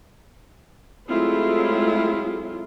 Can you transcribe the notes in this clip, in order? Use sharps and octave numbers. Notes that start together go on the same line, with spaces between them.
F#3 G#3 A3 C4 E4 F4